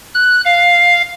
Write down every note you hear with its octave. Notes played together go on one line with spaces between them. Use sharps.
F#6
F5